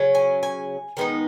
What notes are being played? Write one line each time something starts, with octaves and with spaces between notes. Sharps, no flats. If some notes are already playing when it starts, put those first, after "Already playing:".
Already playing: C#3 F#3 C#4
G#5
G#5
D#3 G#3 B3 D#4